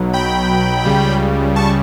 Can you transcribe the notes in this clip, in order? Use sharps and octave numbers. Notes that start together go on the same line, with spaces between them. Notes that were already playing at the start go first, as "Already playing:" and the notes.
Already playing: B1 B2 F#3
G5 B5
C#2 C#3 G3
A5 C#6